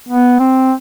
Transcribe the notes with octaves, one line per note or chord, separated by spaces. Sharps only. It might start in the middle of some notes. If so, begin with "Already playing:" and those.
B3
C4